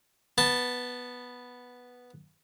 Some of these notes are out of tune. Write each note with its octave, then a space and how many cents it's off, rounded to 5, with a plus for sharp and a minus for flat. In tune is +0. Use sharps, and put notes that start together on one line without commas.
B3 +0 A5 +0